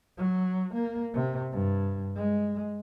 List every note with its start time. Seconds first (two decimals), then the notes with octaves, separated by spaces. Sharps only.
0.18 F#3
0.74 A#3
1.14 C3
1.52 G2
2.16 G#3